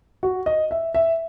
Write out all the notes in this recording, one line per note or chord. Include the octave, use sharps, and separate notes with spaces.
F#4
D#5
E5
E5